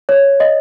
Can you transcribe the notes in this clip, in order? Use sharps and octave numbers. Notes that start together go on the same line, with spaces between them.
C#5
D#5